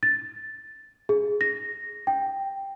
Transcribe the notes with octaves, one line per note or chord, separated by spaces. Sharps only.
A6
G#4
A#6
G5